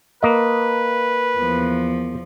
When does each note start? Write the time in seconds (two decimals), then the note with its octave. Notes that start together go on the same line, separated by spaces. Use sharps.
0.23 A#3 B4 D#5
1.38 E2 F3